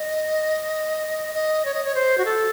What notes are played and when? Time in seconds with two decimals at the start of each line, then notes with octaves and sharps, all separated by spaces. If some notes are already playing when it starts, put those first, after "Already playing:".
Already playing: D#5
1.35 D#5
1.65 C#5
1.74 D#5
1.85 C#5
1.95 C5
2.18 F#4
2.25 A4